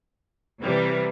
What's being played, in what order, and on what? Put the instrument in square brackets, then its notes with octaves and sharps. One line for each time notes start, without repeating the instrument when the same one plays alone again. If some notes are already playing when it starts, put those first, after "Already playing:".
[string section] C3 E3 G3